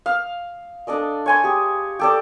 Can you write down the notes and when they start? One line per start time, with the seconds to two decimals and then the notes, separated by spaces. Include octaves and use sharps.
0.06 F5
0.87 D4 A4 D5 D#5
1.26 C#5 G#5 C6
1.44 G4 G#4
1.99 G4 A4 D5